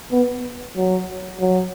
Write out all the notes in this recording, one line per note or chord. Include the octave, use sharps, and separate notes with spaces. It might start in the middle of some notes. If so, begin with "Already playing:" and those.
B3
F#3
F#3